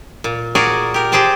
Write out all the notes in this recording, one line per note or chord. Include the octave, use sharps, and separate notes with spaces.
A#2
F#4 G#4 A#4 D5
G4 A#4
G4 G#4 C5 G5 A5